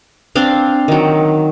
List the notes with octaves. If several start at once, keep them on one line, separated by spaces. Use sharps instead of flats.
C4 D4 F5
D#3 F#3